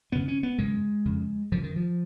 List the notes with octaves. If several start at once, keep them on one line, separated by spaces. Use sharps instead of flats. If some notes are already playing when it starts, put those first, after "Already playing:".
F2 C#3 B3
C#4
B3
F#2 C#3 G#3
F2 C#3
F#2 C#3 F3
D#3
F3